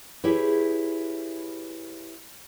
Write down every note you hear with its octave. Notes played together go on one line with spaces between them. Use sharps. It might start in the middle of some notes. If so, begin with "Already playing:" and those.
E4 G4 G#4 B4 C#5 E5